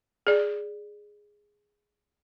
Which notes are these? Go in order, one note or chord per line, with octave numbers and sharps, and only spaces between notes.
G#4 D5